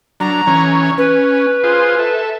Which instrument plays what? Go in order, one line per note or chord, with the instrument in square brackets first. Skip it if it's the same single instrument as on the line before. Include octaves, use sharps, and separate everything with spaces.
[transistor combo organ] F#3 D4 [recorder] A#5
[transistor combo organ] E3 C#4 C#5
[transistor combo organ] C#4 [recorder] B4
[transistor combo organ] F4 G#4 C5
A4 E5